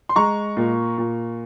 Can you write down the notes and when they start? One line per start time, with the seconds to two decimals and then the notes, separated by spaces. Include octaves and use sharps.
0.09 C6
0.16 G#3 A#5 C#6
0.57 A#2
0.98 A#2